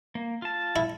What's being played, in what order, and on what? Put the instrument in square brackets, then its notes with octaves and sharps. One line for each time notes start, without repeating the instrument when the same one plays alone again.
[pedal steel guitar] A#3
F4 A5
[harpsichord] E4